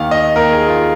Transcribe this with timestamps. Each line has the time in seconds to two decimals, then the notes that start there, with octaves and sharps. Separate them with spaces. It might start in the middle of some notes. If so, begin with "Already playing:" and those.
Already playing: D#2 D#3 F5
0.11 D#5
0.35 D#2 D#3 A#4
0.51 G#4
0.68 F4